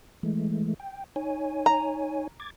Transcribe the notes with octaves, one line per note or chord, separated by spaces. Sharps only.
E3 G#3 A3
G5
D#4 C#5 G#5
A#5
D6 G#6 A6